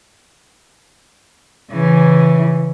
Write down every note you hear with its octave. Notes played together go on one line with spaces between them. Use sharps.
C#3 E3